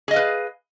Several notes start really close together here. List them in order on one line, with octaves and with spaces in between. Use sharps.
G#4 D#5 F5 B4